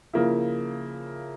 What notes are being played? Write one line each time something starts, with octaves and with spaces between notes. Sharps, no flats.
C#3 F3 A#3 E4